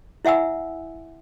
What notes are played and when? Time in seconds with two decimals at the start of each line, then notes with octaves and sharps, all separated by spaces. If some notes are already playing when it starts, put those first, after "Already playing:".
0.25 E4 E5 F#5 G#5 E6